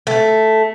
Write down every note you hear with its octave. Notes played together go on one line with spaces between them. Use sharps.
A3